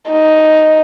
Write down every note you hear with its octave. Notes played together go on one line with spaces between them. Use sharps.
D#4